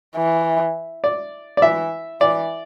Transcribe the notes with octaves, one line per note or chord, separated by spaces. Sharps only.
E3
D5
D5
E3 E5
E3 D5